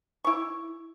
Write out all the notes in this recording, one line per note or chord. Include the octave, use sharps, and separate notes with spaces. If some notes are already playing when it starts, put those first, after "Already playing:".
E4 C#6